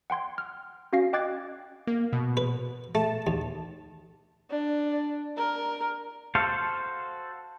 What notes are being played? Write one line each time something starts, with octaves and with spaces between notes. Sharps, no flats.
F#5 G5 C6 G#6
F6
C#4 F#4 F5 A#6 C7
D#5 G5 D6 F#6 G#6 A6
A#3
B2
B4
A3 A5
D#2
D4
A#4
F#4 A4 C5 F5